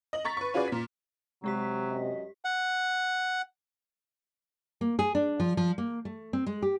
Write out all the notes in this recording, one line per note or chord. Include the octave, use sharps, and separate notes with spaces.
D#5 F#7
A#5 C#6 A6 B6
B4 C#6
C#4 F4 F#4 G#4 B4 D5
A#2 B6
C3 F#3 G#3 G4 B6
F#2 F#4 D#5
F#5
A#3
G#4
D4
F3
F3
A#3
A3
C4
G#3
G4